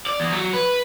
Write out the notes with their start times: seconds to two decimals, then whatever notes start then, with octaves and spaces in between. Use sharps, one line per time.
0.06 D5
0.20 E2
0.32 F#3
0.54 B4